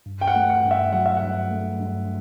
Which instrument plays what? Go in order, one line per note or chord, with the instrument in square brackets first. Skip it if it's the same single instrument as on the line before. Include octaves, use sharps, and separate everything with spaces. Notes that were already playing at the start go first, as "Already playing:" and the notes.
[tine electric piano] G2
[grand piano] G5
F#5
[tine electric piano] A3
[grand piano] F#5
[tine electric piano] G2
[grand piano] E5
[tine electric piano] F#3 [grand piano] F#5
[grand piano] E5
F#5
[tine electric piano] G2
A3
G2